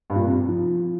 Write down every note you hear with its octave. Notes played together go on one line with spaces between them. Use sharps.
G2
A#2
C3
F3